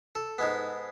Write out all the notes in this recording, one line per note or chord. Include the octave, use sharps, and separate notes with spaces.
A4
G#2 G#3 B3